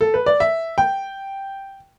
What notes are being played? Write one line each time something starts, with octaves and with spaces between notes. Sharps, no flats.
A4
B4
D5
E5
G5